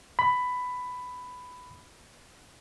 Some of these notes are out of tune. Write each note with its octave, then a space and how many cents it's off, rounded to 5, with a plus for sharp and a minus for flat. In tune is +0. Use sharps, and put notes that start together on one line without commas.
B5 +10